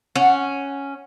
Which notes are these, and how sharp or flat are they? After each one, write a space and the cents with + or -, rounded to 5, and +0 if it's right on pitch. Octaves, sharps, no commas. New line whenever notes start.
C#4 +0 F#5 +0